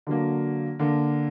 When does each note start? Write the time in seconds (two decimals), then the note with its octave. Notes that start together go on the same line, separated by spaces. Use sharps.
0.07 D3 F#3 A#3
0.79 D3 A#3